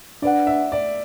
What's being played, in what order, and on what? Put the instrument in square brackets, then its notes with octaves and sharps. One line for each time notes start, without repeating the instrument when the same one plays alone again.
[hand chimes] D4 B4 F#5 [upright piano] D5
[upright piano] E5
D5